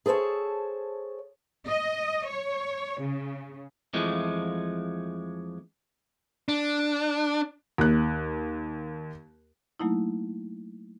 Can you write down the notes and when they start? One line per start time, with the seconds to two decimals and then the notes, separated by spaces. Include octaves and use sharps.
0.06 G#4 A4 C5 C#5 A5
1.67 D#5
2.28 C#5
3.02 C#3
3.93 F2 E3 F3 G#3 A3
6.48 D4
7.78 D#2 F#6
9.80 F#3 A3 A#3 D#4 E4